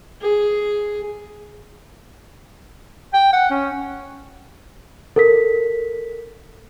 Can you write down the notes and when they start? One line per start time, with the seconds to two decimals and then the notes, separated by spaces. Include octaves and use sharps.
0.21 G#4
3.14 G5
3.33 F#5
3.50 C#4
5.16 A4 A#4 B6